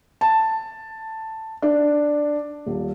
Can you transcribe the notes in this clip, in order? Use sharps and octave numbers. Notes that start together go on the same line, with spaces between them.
A5
D4
D#1